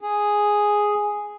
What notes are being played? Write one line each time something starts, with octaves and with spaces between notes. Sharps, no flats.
G#4